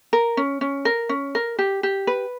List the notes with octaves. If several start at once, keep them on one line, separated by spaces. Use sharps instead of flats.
A#4
C#4
C#4
A#4
C#4
A#4
G4
G4
B4